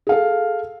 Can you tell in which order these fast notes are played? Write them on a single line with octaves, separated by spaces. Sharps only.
G#4 F5 A4